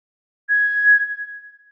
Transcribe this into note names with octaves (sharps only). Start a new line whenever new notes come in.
G#6